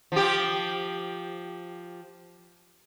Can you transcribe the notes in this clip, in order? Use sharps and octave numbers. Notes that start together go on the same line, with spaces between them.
F3 G4